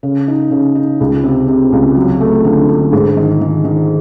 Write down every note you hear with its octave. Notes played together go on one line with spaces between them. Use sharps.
C#3
D#4
C#3
D#4
C#2
C3
C3
C#2
F#3
A3
D3
D3
G#2
D#3
D#3
D#3